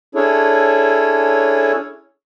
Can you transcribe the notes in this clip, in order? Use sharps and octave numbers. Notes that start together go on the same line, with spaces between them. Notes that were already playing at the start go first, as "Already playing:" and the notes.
C#4 D4 E4 G#4 A4 C#5